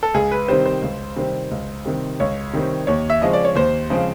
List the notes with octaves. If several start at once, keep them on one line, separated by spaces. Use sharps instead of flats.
A4
C#2 G#4
B4
C3 D#3 G3 C4 C5
C5
C#2
C3 D#3 G3 C4
C#2
C3 D#3 G3 C4
C#2 C#5
C3 D#3 G3 C4
D#2 C#5
E5
C#3 F3 G#3 C4 D#5
D5
C#5
D#2 C5
C#3 F3 G#3 C4